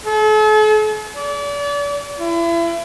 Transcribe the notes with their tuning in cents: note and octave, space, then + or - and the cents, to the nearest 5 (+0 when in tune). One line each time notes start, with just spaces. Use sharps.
A4 -45
D5 -35
E4 +35